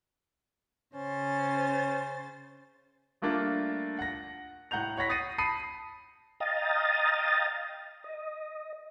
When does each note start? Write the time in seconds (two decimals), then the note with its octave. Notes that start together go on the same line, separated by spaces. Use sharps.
0.95 C#3 C#4 C5 A6
3.22 G3 A3 A#3 D4 F4
3.99 F#5 A#6
4.71 A2 F#5 A#5 G6 F7
4.97 C#5 F#5 B5 A#6 B6
5.09 D#6 A6 A#6 C7 C#7 D#7
5.38 A5 B5 D#6 C7 C#7 D#7
6.40 D#5 F5 G5 A#5 D#6 A6
8.04 D#5